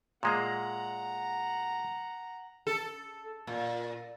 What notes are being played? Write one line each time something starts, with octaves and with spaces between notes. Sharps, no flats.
A#2 G#3 A#3 F#5 A#5
A4
A#2